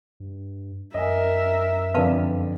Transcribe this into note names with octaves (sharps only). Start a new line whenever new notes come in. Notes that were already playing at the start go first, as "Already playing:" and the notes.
G2
F#2 A#4 D#5 E5 G#5
F2 D3 B4 D5 F5 A5